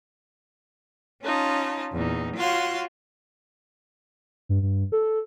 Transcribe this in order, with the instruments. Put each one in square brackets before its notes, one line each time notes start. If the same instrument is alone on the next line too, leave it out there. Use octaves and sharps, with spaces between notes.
[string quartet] C#4 D#4 F4 A5
E2 A#2 D#4
F4 F#4 C#5 F5 C6
[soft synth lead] G2
G2
A4